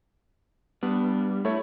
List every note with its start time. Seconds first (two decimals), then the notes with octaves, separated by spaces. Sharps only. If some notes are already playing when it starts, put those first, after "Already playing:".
0.83 G3 B3 D4
1.45 A3 E4 C#5